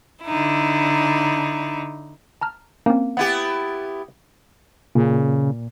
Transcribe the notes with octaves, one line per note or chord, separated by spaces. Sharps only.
D3 D#4 E4
A5 A#5 F6
A#3 C4 C#4
B3 E4 G4 F#5
A#2 C#3